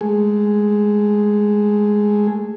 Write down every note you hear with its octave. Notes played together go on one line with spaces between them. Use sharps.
G#3 A3 G#4